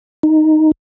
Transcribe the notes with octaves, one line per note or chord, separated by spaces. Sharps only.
D#4